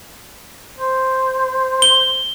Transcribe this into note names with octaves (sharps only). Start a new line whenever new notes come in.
C5
G7